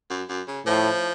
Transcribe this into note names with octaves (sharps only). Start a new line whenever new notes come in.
F#2
F#2
C#3
A2 F3